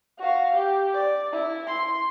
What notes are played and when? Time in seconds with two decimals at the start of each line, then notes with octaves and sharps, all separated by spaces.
0.19 F#4 F5
0.54 G4
0.93 D5
1.32 E4
1.67 C6